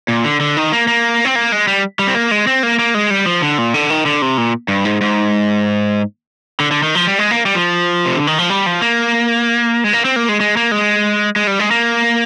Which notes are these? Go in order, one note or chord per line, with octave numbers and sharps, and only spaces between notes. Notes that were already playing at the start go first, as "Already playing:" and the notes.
A#2
D3
D3
D#3
A#3
A#3
C4
A#3
G#3
G3
G3
C4
A#3
G#3
C4
A#3
A#3
G#3
G3
F3
D3
A#2
D3
D#3
D3
C3
A#2
G2
G#2
G#2
D3
D3
D#3
F3
G3
G#3
A#3
G3
F3
C3
D3
D#3
F3
G3
F3
A#3
G#3
A#3
C4
A#3
G#3
G#3
A#3
G#3
G#3
G3
G#3
A#3